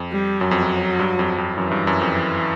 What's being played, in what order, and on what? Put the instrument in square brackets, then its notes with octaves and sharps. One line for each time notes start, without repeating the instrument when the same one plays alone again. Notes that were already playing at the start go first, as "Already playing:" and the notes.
Already playing: [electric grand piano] F2
[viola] G3
[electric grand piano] F#2 [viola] F#3
[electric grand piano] F2
F#2
G2
F2
F2
[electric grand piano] F#2 [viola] E3
[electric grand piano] G2
F#2
F2